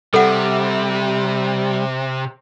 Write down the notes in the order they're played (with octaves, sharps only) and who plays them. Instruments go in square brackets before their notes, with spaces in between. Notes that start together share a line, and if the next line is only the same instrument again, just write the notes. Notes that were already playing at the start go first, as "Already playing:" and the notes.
[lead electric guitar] C3 [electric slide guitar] G3 [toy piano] A4 F#5